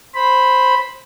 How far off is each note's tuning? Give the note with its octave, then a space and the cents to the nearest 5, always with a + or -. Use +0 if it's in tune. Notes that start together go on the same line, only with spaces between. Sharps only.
C5 +0 B5 +0